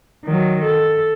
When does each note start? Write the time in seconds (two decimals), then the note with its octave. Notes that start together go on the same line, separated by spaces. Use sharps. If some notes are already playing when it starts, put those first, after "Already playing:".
0.25 D#3 F#3
0.65 A4